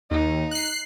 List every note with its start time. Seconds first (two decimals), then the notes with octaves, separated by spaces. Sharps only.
0.11 D#2 D#4
0.51 F#6 C7